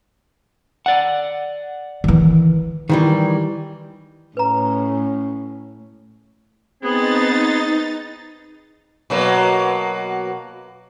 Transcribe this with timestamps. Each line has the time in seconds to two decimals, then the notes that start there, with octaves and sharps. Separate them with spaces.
0.86 D5 F#5
2.04 D#3 E3
2.89 D#3 E3 G3
4.37 A2 C#4 B4 A#5
6.83 B3 C4 D#4 G#4 A6
9.10 B2 F#3 A#3